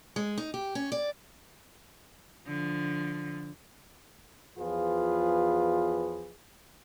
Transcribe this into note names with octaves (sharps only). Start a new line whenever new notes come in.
G#3
D#4
G4
C#4
D5
D3 F3
E2 F3 F4 G#4 B4